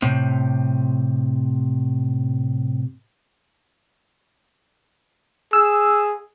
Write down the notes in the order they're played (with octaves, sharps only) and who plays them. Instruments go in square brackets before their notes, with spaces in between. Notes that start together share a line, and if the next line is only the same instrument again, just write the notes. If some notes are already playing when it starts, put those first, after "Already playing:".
[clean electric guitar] A2 C3
[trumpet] G#4 [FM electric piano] E6